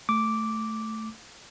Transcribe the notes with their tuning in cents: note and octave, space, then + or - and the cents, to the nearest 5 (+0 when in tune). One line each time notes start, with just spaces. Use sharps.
A3 +0 D6 -5